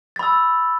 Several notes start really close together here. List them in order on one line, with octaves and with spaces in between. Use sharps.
A6 B5 E6